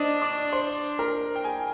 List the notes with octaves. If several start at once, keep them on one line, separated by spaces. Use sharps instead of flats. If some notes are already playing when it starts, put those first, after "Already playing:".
Already playing: D4 C5 D5 D#5 D#6
D5 D6
C5 C6
A#4 A#5
G5
G#4 G#5